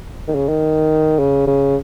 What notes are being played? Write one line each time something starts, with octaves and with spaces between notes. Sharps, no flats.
D#3
C#3
D#3
C#3
C#3